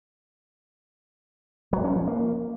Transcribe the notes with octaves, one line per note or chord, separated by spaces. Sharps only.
F#3
C#4
F3
A#3